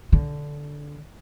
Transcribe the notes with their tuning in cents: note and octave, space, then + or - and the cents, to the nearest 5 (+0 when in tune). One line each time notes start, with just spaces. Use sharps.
D3 -10